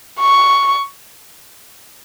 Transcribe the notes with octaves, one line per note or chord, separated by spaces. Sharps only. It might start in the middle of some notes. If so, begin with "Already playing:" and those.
C#6